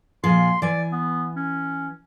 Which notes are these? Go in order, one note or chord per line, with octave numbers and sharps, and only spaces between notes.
A#2 F3 G#4 C6
E3 D5 G#5
B3
C#4